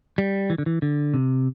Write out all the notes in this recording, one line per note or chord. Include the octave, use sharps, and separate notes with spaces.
G3
E3
D3
E3
D3
C3